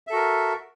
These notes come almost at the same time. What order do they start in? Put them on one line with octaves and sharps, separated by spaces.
E5 A4 F#4 A#4